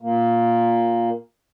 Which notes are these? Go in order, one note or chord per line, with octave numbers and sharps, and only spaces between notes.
A#2 A#3